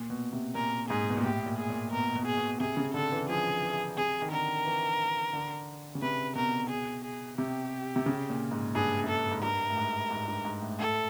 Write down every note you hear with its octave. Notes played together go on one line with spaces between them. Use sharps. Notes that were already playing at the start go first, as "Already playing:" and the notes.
Already playing: A#2
B2
C3
A#2 A#4
G#2 G#4
B2
A#2
A2 G4
A#2
G#4
A#2
B2 A#4
B2
G#4
B2
C3 G#4
C#3
D3 A4
E3
F3 G#4
E3
C3 G#4
D#3
D3 A#4
E3
D3
C#3
C3 B4
B2 A#4
G#4
G#4
C3 G4
C3
C#3
A#2
G#2
G2 G#4
F#2
G2 A4
G#2
G2 A#4
A2
G#2
G#2
G2
G#2
A2
A2 A4